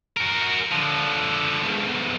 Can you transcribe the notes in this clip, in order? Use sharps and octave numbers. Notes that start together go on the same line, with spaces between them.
F#4 A#4
D3 F3
B1 G#2